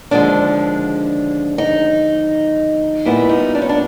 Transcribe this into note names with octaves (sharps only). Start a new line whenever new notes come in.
D#2 D3 F3 G#3 D4
D#4
A#2 G3 B3 E4
D#4
D4
C#4
D4